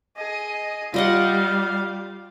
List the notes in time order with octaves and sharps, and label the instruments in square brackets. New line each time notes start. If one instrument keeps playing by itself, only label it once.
[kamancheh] G#4 D#5
[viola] G3 [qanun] F4 D#5 F#5 [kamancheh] F5